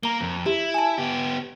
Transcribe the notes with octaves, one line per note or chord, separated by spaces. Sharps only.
A#3 A#5 G7
F2
E4 G4
G#5 A5
B3 G4